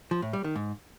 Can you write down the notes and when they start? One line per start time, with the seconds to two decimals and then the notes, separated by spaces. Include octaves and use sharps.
0.11 F3
0.22 A2
0.33 G3
0.44 D#3
0.56 G#2